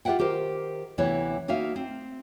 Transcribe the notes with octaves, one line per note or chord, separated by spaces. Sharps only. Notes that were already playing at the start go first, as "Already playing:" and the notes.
F4 G4 C5 E5 F#5 G5
D#3 G4 A#4 C5
D2 C3 E3 B3 E4 C#5
A#3 D#4 F#4 E5 F5
C4